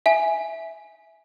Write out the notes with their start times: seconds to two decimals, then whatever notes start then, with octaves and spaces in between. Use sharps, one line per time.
0.06 E5 G#5